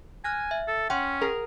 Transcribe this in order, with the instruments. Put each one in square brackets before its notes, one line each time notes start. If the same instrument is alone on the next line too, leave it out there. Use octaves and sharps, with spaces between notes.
[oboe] G#5 [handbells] F6 F#6 A#6
[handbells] E5
[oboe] A4
[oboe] C#4 [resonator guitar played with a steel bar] F#5 [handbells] G5 C6
[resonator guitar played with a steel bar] G#4 A#4